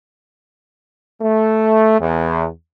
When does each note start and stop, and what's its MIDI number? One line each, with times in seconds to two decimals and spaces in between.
1.22 1.99 57
2.00 2.46 40